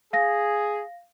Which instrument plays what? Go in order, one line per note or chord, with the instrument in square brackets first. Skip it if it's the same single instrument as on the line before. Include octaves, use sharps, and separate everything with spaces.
[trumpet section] G#4 [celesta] F5 A#6